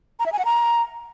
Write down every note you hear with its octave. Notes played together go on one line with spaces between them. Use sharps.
A#5
E5
G#5
F#5
A#5